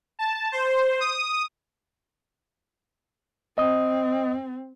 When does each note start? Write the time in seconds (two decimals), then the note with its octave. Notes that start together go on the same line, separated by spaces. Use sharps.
0.19 A5
0.52 C5
1.00 D#6
3.58 C4 D#5 D#6